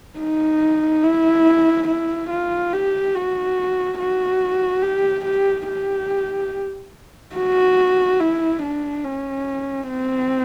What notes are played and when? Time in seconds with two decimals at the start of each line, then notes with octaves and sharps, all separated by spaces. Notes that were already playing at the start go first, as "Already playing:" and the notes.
0.19 D#4
1.04 E4
1.88 E4
2.30 F4
2.73 G4
3.15 F#4
3.99 F#4
4.82 G4
5.25 G4
5.68 G4
7.36 F#4
8.21 E4
8.63 D4
9.04 C#4
9.89 C4